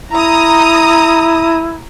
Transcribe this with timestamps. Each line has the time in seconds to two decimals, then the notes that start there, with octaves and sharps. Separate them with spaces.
0.12 E4 A#5 D#6